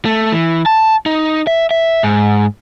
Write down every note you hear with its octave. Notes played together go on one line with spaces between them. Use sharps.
A3
E3
A5
D#4
E5
E5
G#2